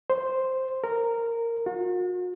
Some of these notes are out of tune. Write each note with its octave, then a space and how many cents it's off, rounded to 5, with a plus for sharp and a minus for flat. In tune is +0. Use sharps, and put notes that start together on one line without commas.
C5 +0
A#4 -10
F#4 -45